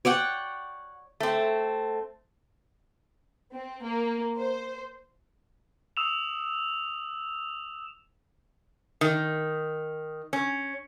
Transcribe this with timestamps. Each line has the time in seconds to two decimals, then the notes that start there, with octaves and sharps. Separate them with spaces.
0.05 C#5 D5 F#5 G5
1.20 A3 C4
3.53 C4
3.84 A#3
4.37 C5
5.97 D#6 E6 E7 F7
9.01 D#3
10.33 C#4